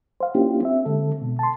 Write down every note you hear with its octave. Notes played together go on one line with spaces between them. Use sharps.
C5 F5
A#3 C#4 D4 E4 F4 G4
C4 E5
D3 G#3 A4
B2
A5 C6